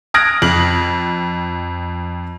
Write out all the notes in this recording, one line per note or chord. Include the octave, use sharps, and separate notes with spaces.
D#6 F6 F#6 G#6 A#6 D7
F2 F#7